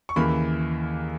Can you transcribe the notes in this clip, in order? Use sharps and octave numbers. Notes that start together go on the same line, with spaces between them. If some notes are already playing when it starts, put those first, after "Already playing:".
C#6
D#2 C#3 E3 A#3 B5